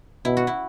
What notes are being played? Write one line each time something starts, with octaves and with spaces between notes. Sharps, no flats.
B2 E4
F#4
E4